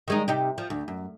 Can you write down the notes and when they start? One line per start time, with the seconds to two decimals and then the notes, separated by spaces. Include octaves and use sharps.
0.08 D#3 G#3 D#4
0.28 C3 D#4 G4
0.58 F3
0.70 D2
0.88 F#2